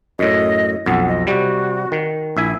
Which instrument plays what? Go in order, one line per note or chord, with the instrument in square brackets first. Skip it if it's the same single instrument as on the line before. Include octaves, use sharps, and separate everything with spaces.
[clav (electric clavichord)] F#2 A2 [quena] D#5
[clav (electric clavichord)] B1 F2 [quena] F#5
[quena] D#5
[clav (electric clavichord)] C3 G3 [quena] F#4
[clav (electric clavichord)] D#3
[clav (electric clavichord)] A#1 E5 G#5 [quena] E4